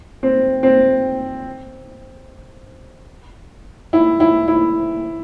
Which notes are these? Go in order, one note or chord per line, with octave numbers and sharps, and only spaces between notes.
C4
C4
E4
E4
E4